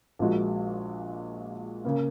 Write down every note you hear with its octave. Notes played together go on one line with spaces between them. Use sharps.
A#1 A#2 G#3 F#4
C#3 A#3